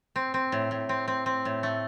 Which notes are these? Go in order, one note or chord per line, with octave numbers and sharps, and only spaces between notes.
C4
C4
A2
A2
C4
C4
C4
A2
A3